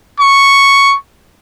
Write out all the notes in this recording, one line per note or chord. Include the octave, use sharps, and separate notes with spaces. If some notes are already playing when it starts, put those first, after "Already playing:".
C#6